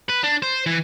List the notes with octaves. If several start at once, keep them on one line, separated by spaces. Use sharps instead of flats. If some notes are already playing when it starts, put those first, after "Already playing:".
B4
D4
C5
E3